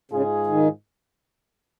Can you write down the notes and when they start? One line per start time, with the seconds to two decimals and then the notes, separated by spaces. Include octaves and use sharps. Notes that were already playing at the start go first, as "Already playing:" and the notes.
0.11 G#2 C#3 G#3 F4 G#4
0.47 D#3